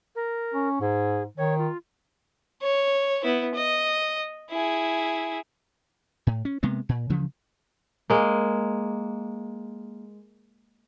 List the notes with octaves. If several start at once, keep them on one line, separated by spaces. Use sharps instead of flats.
A#4
C#4
G#2 G#4
D#3 C#5
F4
C#5
B3 E4
D#5
E4 G#4
A2
C#4
C3 G#3 A#3 B3
A#2
D2 C#3 E3 F3
G#3 A#3